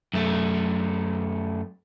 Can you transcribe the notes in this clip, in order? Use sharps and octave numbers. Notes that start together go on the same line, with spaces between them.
F#2 A3